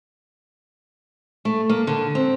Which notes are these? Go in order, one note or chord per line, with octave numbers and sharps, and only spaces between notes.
A3
A#3
D3
C4